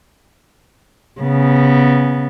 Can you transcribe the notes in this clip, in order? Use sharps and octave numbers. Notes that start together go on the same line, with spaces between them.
C#3 B3